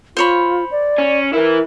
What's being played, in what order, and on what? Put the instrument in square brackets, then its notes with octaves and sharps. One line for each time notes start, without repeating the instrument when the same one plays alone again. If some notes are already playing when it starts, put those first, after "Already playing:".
[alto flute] F4 [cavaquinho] C5 C#5 B5
[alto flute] D5
[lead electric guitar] C#4
[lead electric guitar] E3 E4 [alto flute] A#4